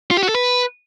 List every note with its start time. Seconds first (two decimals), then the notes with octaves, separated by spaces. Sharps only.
0.11 F4
0.17 G4
0.23 F#4
0.29 A4
0.35 B4